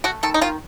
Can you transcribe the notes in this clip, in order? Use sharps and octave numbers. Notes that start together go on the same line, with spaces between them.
A3 F#4
D#3 A4
D#4
D#3 F4